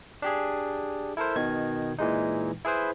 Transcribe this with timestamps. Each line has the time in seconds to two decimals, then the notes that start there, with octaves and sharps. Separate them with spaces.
0.22 D4 G4 G#4
1.17 E4 A4 A#4 C5
1.36 B2 D#3 G#6
1.98 A#2 E3 G#3 D#4
2.65 E4 G#4 B4 C5